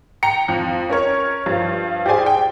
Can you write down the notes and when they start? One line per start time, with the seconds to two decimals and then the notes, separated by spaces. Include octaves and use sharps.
0.23 G5 A#5 C#7
0.48 F2
0.90 C#4 A#4 C#5
1.46 G2 F3
2.06 G4 G#4 C5 D5 G#5
2.26 G5